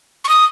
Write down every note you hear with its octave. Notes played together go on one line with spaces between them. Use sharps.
C#6
D#6